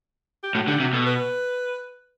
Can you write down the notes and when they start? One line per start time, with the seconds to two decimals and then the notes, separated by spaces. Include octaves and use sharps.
0.43 G4
0.55 A2 F#4
0.67 D3 G4
0.80 C3 F#4
0.93 B2 A4
1.06 B4